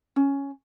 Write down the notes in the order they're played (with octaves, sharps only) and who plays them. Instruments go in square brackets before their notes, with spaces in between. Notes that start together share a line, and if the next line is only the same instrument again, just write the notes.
[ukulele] C#4